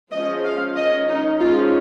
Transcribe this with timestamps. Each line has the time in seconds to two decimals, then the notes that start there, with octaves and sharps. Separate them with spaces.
0.12 F3 G#3 C#4 D#5
0.44 F5
0.76 D#3 C#4 D#5
1.08 D#4
1.40 F3 G#3 C#4 F4